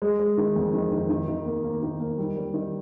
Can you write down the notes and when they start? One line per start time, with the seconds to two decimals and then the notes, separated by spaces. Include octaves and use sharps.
0.02 G#3
0.20 G#3
0.38 D#3
0.56 F2
0.73 D#3
0.92 D#3
1.09 D#3
1.28 D#3
1.46 A#3
1.64 A#3
1.82 D#3
2.00 A#3
2.18 G3
2.36 G3
2.54 D#3